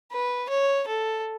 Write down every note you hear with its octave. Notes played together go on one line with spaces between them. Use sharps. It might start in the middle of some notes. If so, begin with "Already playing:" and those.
B4
C#5
A4